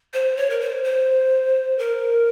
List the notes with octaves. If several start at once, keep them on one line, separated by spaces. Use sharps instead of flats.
C5
C#5
A#4
C5
C5
A#4